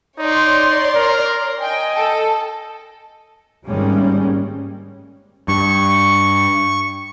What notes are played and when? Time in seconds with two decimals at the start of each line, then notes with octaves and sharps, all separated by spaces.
0.19 D#4 C#5 D5 C6
0.96 A#4
1.61 D#5 G5 G#5
1.94 A4
3.65 G#1 G3 G#3 A#3 C#4
5.48 G2 C#6